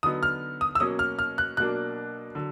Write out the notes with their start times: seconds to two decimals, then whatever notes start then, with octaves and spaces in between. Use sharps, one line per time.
0.03 D3 F#3 B3 D#4 D#6
0.23 F6
0.61 D#6
0.75 E6
0.80 B2 F#3 A#3 C#4 D#6
0.99 F6
1.19 F6
1.38 F#6
1.57 B2 F#3 A#3 D4 F#6
2.35 D3 F#3